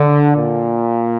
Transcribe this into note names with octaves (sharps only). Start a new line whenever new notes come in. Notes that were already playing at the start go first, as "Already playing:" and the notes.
Already playing: D3
A#2